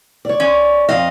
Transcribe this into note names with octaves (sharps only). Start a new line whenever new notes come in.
C#5 D5
C#4
F2 D#5 F5